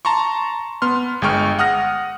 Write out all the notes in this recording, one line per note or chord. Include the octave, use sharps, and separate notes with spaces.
A5 A#5 C6 C#6
B3 C6 F6
G1 G#3 G5 C#6 F6
F#5 D#6 F6 A#6